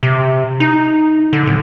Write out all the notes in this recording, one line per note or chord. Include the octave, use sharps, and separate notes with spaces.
C3
D#4
D3
D1